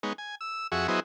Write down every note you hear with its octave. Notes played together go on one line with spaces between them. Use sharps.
G#3 B3 D#4 C#5
G#5
E6
F2 F#4 G#4 E5 C#6
F#3 B3 E4 G#4 C5 D#5